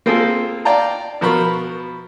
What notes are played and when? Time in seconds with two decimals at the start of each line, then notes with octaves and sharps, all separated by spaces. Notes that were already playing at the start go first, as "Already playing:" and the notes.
0.06 A#3 C4 F4 G#4 A4
0.65 D5 F5 G5 A5 A#5
1.21 B2 F3 A#4 B5 C#6